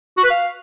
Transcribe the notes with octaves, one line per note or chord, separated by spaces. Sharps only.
F#4
B4
F5